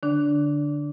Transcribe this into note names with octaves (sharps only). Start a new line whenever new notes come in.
D3 D4